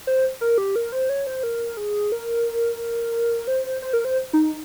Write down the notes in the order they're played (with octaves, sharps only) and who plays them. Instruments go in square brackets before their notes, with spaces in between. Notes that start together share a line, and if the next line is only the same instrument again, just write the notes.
[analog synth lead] C5
A#4
G4
A#4
C5
C#5
C5
A#4
G#4
A#4
C5
C5
A#4
C5
D#4